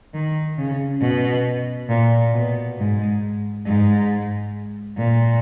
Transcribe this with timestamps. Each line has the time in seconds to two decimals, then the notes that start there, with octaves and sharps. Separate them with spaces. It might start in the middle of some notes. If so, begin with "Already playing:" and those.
0.14 D#3
0.58 C#3
1.01 B2
1.89 A#2
2.33 B2
2.78 G#2
3.66 G#2
4.98 A#2